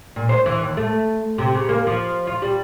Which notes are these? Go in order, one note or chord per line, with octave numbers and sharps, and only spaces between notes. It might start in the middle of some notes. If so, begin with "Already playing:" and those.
A#2
C5
E3
D#2
A3
C3
C#3
A#3
F3
F4
G3